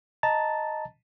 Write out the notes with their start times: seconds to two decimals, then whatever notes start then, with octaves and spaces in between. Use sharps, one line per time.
0.23 D#5 A5 A#5 A6